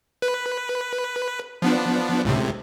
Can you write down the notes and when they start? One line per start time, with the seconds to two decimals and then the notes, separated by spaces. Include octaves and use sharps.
0.22 B4
1.62 F3 B3 D4
2.25 C#2 A2 C3